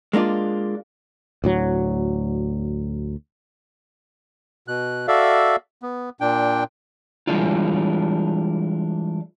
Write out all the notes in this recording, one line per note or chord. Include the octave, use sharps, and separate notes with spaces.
G#3 A#3 D4 F4
D2 A2 F#3
B2 F#6
F#4 A4 D5 E5 F5
B3
A#2 D4 G5
E3 G3 G#3 D4 E4 F4